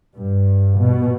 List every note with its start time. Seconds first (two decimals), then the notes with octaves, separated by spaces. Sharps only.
0.16 G2
0.78 B2